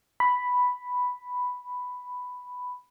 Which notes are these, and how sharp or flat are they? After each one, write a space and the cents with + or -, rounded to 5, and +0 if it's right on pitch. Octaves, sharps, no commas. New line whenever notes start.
B5 +5